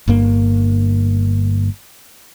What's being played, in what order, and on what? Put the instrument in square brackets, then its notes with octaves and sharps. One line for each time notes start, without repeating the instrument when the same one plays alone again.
[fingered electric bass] G1 G2 A#3